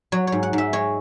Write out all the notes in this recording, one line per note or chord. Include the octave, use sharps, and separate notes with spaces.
F#3 C#5
C#5
G#2
F#5
G#2 E5
G#3 C#5